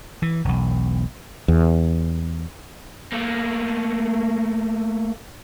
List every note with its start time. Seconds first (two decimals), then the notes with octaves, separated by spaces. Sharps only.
0.22 E3
0.45 E1 B1
1.48 E2
3.13 A3 A#3